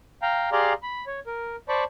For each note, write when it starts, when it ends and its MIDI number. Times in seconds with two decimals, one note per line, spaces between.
0.22 0.50 77
0.22 0.50 79
0.22 0.50 82
0.52 0.73 67
0.52 0.73 68
0.52 0.73 74
0.52 0.73 77
0.52 0.73 82
0.52 0.73 84
0.83 1.05 83
1.07 1.20 73
1.27 1.56 70
1.68 1.84 72
1.68 1.84 74
1.68 1.84 81
1.68 1.84 83
1.68 1.84 85